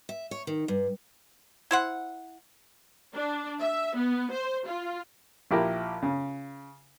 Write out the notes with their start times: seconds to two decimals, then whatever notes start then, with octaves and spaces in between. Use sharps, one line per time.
0.09 E5
0.31 C#5
0.47 D#3
0.68 G2
1.71 E4 C5 F#5
3.15 D4
3.60 E5
3.96 B3
4.32 C5
4.67 F4
5.51 A#1 E4 G4 A#4
6.03 C#3